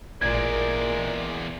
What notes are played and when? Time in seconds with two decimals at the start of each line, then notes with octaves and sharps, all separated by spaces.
0.21 A1 E2 A#2 G#3 A#4 D5 G#6